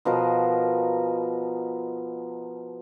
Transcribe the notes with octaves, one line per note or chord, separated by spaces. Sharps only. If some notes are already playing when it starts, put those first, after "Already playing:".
B2 F3 A#4 D#5